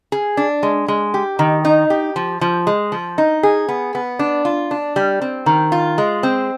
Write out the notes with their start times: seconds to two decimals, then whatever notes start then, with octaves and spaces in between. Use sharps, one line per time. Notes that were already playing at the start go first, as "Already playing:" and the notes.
0.12 G#4
0.37 D4
0.63 G#3
0.88 G#3
1.14 G4
1.39 D#3
1.65 D#4
1.90 G4
2.16 F3
2.41 F3
2.67 G#3
2.92 F3
3.18 D#4
3.43 G#4
3.68 B3
3.95 B3
4.19 D4
4.45 F4
4.71 D4
4.96 G3
5.21 C4
5.46 D#3
5.72 F4
5.98 G#3
6.23 C4